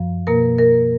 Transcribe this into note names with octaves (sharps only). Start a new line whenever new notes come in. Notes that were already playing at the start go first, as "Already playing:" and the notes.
Already playing: F#2 F3
B2 A#3 A#4
A#4